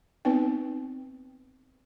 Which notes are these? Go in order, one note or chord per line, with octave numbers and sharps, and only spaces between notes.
B3 C4 D#4 B4 G5